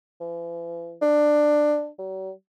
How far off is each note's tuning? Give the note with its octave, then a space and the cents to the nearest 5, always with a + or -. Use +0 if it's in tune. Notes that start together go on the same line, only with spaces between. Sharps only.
E3 +45
D4 +15
F#3 +45